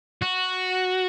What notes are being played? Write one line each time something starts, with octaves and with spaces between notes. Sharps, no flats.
F#4